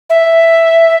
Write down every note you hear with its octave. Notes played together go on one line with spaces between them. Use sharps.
E5